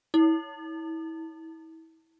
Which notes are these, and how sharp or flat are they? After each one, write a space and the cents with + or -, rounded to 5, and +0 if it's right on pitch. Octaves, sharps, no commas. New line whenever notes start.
E4 -30